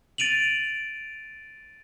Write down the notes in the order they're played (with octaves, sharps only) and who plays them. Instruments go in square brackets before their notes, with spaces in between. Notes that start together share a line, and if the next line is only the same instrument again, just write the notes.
[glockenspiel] A6 D7 D#7 F7 F#7